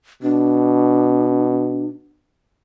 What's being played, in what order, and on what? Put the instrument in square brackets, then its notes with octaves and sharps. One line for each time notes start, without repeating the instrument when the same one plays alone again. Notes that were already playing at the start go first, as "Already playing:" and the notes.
[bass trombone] B2 [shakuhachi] D4